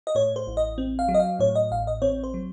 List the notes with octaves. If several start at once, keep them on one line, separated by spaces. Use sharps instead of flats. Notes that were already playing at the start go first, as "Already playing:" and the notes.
D#5
A2 C#5
C5
A1
D#5
C4
F5
F#3
D#5
F5
A2 C#5
D#5
A1 F5
D#5
C4 C#5
C5
F#3